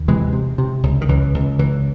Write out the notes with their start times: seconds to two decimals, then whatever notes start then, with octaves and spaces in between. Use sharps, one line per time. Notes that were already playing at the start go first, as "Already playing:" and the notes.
Already playing: D#2
0.08 C3 E3 G#3
0.33 C3
0.58 C3
0.83 C#2
1.01 D#3
1.09 C#2 E3
1.34 C#2
1.59 C#2 E3